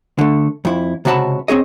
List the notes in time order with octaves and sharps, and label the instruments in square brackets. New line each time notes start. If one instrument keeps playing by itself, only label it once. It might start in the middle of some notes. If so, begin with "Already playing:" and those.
[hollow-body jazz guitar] D3 A3
F2 E4
C#2 C3 F#4 E5 A5 B5
C4 C#4 G#4 D#5